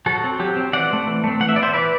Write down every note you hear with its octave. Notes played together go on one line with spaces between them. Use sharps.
F#3 F#4 A4
C4
F#3 G4
C4
E3 D5 F#5
A3 C4
E3
A3 C4
E3 F#5
E5
B3 D5
C5 E5
E3 B4 D5